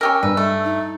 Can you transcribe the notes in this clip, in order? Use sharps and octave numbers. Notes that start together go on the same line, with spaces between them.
C#4 G4 A#4 E6
G2 B4
A3
D#4